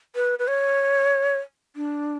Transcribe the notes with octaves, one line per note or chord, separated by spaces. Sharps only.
B4
B4
C#5
D4